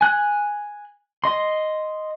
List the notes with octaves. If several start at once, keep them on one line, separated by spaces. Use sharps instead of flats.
G#5 F#6
D#5 C6